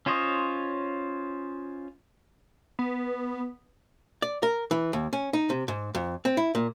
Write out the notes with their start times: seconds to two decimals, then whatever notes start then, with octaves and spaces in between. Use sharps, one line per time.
0.06 C#4 F4 C5 C#5 D#5
2.79 B3
4.22 D5
4.43 A#4
4.71 E3
4.93 D#2
5.13 C#4
5.33 D#4
5.50 C3
5.68 G#2
5.95 F2
6.25 C4
6.37 E4
6.55 A#2